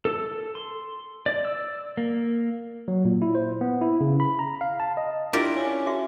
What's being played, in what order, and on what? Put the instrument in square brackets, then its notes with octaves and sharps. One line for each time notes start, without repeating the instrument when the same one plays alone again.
[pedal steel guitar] A4
C6
D5
E6
[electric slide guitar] A#3
[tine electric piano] F#3
A#2
E4
C5
B3
E4
C#3
B5
A#5
F5
A5
D#5
[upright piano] D4 E4 [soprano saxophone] F4 [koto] G4 A#4 D5
[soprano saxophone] C#4
[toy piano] F#4 G#4 E5